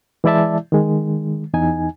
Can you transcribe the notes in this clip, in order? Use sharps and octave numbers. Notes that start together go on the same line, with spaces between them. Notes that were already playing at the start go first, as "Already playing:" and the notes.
E3 G#3 E4 D5 E5 A5
D#3 G#3
E2 D#4 G#5